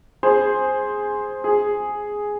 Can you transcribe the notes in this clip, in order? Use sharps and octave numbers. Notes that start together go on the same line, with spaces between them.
G#4 C5
G#4